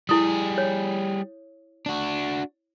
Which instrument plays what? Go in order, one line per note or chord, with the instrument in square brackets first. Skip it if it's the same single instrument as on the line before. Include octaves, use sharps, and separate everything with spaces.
[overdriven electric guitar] G3 G#4 [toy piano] E4 D#6
[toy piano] C#5
[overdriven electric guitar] D4 F#4